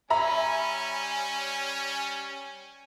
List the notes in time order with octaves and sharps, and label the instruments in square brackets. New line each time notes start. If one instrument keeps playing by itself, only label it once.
[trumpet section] G3 C#4 G#5 [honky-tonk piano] E5 A#5 B5